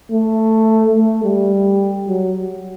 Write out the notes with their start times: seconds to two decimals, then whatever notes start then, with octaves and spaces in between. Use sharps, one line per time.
0.11 A3
0.95 A3
1.24 G3
2.08 F#3